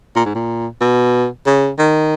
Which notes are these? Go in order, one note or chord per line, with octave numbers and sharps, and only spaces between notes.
A#2
G#2
A#2
B2
C#3
D#3